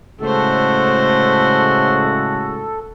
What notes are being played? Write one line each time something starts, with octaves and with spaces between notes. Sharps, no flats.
A2 C#3 G#3 A3 F#4 A4 C5